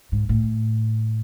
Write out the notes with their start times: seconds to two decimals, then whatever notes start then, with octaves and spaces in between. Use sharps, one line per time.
0.12 G#2
0.29 A2